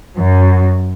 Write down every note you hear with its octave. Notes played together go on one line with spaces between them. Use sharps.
F#2